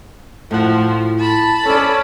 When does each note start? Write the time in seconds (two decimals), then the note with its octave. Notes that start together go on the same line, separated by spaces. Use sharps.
0.51 A2 F3 F#5
1.19 A5 B5
1.65 C#4 A4 C5 D5